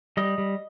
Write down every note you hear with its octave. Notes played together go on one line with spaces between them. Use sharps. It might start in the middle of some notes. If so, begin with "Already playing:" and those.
G3 D#5
G3